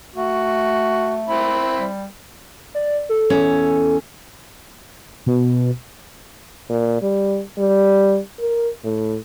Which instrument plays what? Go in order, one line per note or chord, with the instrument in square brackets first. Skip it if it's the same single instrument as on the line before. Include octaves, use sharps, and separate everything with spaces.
[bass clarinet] A3 [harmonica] F#4
[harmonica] C4 E4 B5
[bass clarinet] G3
[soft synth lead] D5
A4
[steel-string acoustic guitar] E2 C#4
[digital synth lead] B2
[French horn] A#2
G3
G3
A#4
A2